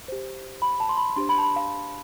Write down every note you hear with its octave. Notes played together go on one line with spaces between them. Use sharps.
G4 C5
B5
A5
C6
B5
D4 G4 C5 C6
B5
A5
B5
F5